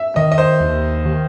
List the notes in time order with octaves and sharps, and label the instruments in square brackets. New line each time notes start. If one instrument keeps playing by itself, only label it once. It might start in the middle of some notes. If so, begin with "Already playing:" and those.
Already playing: [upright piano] E5
[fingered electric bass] D#3 [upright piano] D#5
[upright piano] D#5
C5
[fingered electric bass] D#2
D#3